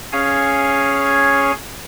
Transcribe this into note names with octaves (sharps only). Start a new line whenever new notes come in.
C#4 G#4 C#5 F5 G#5